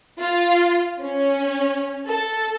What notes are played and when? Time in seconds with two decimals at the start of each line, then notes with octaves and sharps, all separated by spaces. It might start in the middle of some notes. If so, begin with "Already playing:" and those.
0.19 F4
1.01 C#4
2.07 A4